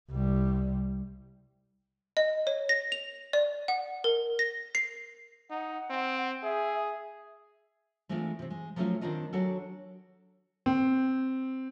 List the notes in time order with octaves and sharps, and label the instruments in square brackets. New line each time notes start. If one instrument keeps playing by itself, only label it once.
[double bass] C2 G3
[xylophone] D#5
C#5
A#6
F7
D5
F#5
A#4
A#6
C7
[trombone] D#4 [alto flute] F#5
[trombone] C4
[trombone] G#4 [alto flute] E5
[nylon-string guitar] E3 G#3 A3 C4 D4 F4
C3 C4
G#3
F3 F#3 A3 C4 C#4 F4
D#3 C4 D4 F4 D#5
F#3 D4 F#4 G#4 A4
[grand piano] C4